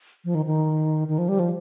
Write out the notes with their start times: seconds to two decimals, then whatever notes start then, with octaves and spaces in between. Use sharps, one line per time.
0.25 F3
0.35 D#3
0.46 D#3
1.08 D#3
1.18 F3
1.29 G3
1.39 F3